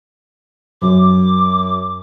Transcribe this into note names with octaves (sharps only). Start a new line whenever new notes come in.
F#2 D6